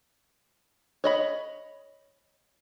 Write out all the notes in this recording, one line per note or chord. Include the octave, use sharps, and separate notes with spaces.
C#5 D#5 B5